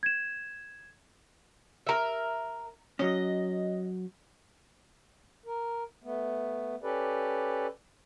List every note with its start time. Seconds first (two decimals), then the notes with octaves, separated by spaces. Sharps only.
0.03 G#6 E7
1.87 A#4 E5
2.99 F#3 C#4 D#5
5.46 A#4
6.04 A3 B3
6.83 C#4 G4 A4 B4 D5